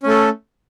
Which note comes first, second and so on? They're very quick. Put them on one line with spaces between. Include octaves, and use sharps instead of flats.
C#4 A3 A4